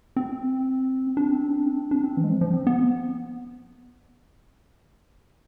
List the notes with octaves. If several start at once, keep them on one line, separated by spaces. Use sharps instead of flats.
C4
D4
C4
D4
C4
D4
C4
E3
G#3
F3
F3
C4
B3